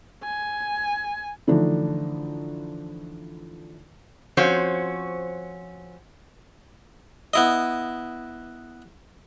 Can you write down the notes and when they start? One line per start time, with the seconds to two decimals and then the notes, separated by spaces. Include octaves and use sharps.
0.24 G#5
1.47 D3 E3 F3 A3 D4 D#4
4.37 F3 C4 C#4 F#4 C5 C#5
7.34 B3 E4 D#5